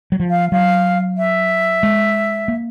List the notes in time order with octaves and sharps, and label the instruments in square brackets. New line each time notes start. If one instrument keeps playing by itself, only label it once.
[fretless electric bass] F#3
F3
[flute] F5
[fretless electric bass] F#3 [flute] F5
[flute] E5
[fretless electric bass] G#3
A#3